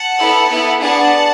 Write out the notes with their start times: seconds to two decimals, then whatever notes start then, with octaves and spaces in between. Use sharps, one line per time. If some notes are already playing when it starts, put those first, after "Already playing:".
Already playing: F#5 A5
0.19 B3 E4 A4
0.50 B3 E4 A4
0.81 B3 D4 G#4 F#5 A5